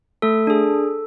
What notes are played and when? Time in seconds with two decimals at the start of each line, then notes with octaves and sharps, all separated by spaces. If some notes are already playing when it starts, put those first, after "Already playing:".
0.22 A3 A4
0.47 D4 G#4